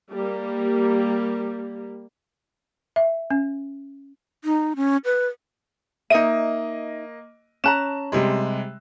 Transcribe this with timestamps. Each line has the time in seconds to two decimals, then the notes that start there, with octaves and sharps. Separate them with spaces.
0.13 G3 A#3
2.96 E5
3.31 C#4
4.44 D#4
4.76 C#4
5.05 B4
6.10 A#3 D#4 D#5 E5 D#7
7.64 C#4 A5 A#5 F#6 E7
8.12 C3 G3 G#3